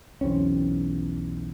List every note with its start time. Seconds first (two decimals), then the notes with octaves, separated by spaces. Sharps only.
0.21 B1 E2 C4 C#4